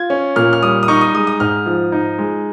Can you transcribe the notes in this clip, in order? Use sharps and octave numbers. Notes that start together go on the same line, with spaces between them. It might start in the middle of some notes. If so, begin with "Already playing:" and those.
Already playing: F4 G#6
C#4
A#2 F6
F6
G3 D#6
D#6
D#4 C#6
D#6
G#3 D#6
D#6
G#2 F6
F3
D#4
G#3